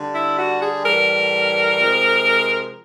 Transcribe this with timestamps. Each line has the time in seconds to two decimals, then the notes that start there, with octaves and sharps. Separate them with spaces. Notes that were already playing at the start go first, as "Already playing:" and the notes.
Already playing: D3 G3
0.14 E4
0.38 F#4
0.61 G#4
0.84 A2 E3 G3 A#4
1.78 C3 F3 G#3